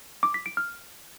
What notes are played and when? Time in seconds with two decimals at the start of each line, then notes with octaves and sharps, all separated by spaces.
0.23 D6
0.34 B6
0.46 D7
0.57 F6